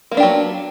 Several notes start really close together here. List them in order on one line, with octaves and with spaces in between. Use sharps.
A#3 B3 D4 G4 F#3